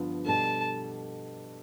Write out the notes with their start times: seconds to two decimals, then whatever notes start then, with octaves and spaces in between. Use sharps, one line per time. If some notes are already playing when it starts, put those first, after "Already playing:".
Already playing: G2 D3 F3 B3 F4
0.25 B2 G3 D4 A4 A5